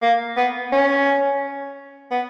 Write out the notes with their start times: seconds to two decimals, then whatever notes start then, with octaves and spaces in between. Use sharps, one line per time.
0.02 A#3
0.37 B3
0.72 C#4
2.11 B3